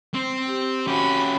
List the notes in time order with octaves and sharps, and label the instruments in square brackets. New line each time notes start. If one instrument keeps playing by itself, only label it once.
[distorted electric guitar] C4
[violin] G4
[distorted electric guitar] C#4 G4 [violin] F#4 B5